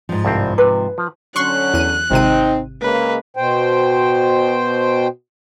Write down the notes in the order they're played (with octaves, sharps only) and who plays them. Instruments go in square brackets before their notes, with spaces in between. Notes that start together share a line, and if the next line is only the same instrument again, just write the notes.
[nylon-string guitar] G#2 F3
[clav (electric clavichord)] C2 G2 C4
[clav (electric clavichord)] C3 [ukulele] B4
[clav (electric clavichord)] F3
[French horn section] D3 F#3 C#4 [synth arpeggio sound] C6 C#6 [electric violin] F#6
[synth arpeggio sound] E2 D#7
[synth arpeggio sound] G#1 C3 D#7 [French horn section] C4 D#4
[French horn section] C#3 G#3 A#3 [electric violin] B4
[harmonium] B2 C5 G5